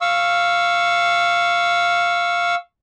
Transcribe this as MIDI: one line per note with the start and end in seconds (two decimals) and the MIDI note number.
0.01 2.55 77
0.01 2.55 85
0.01 2.55 88